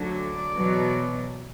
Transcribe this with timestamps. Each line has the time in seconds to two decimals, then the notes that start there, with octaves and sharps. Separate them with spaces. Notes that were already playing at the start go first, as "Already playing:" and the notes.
Already playing: D2 D3 F#3
0.16 D5
0.54 E2 B2 F#3